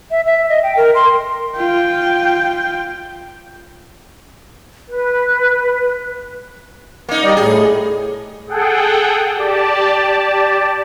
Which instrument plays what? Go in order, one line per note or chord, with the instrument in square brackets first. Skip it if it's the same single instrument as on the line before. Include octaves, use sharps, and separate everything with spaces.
[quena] E5
E5
D#5
G5
A#4
C6
[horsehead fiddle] F4 G5
[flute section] B4
[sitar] A#3 D#4
[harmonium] G3 D5 D#5
[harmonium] A2 [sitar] G#4
[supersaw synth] G#4 A4 F#5 G5
G4 D5 A5